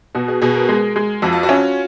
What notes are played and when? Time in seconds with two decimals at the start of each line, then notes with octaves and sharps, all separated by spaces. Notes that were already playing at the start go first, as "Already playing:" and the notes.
0.15 B2 F#4
0.28 G#4
0.42 B2 G#4
0.55 A#4
0.68 G#3 G#4
0.96 G#3
1.22 F2 F#4
1.33 F4
1.43 F#4
1.49 C#4